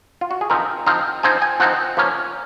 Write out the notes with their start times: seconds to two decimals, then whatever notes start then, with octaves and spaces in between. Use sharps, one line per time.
0.21 F4
0.31 F#4
0.41 G#4
0.50 F3 C4 D#4 A#4
0.86 F3 C4 D#4 F5
1.23 F3 C4 D#4 G#5
1.42 G#5
1.60 F3 C4 D#4 F#5
1.97 F3 A#3 C#4